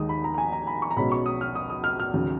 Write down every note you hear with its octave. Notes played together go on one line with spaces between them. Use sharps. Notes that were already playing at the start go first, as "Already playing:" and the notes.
Already playing: D#2 D#3 G#3 D#6
B5
A#5
A#5
G#5
A#5
B5
C#6
A#5
B1 B2 G#3 C#4 B5
C#6
D#6
F6
D#6
D#6
F6
F6
D#2 C#3 F#3